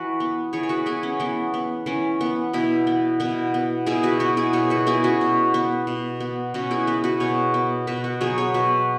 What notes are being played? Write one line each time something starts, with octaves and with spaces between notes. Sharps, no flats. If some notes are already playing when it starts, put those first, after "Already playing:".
Already playing: E3 F#4 B4
B3
E3 G#4 C#5
C#5
F#4 B4
B3 E4 G#4
C#4
E3 B3
B3
E3 C#4
B3
B2 B3 E4
B3
B2 B3 E4
B3
B2 E4 G#4
F#4 B4
B3 F#4 B4
E4 G#4
B2 G#4 C#5
F#4 B4
B3 E4 G#4
C#4 F#4
B2
B3
B2
B3
B2 C#4 F#4
E4 G#4
B3 F#4 B4
F#4 B4
B2 G#4 C#5
B3
B2 F#4 B4
F#4 B4
F#3 B3 G#4 C#5
G#4 C#5
B2 F#4 B4